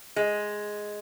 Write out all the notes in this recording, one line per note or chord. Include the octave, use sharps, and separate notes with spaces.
G#3